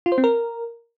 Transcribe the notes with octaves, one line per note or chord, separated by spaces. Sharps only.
F4
C5
C4
A#4